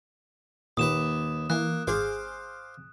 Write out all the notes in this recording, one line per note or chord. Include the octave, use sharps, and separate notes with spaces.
D#2 A#2 B4 D#6 E7
E3 A#3 F#6
G#1 G#4 C5 F5 D6